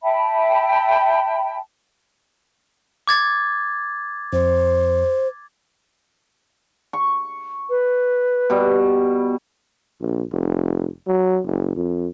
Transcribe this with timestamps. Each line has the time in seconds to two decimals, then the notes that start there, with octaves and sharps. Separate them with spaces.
0.03 E5 G5 A5 B5
3.07 D6 G#6 A6
4.33 F2 C5
6.93 C#6
7.70 B4
8.50 B2 G3
10.00 A#1
10.32 F1
11.07 F#3
11.45 F#1
11.76 F2